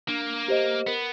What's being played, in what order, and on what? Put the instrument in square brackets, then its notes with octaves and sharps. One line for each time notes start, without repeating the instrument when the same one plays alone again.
[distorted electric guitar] A#3 [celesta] D4
[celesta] G4 C5 D#5
[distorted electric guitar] B3 [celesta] A#4